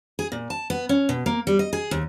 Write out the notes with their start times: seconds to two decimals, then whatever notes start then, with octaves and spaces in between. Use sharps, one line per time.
0.19 G#4
0.32 A#2
0.50 A5
0.70 B3
0.89 C#4
1.09 B2
1.26 A#3
1.47 G3
1.59 D#5
1.73 G#4
1.91 D#2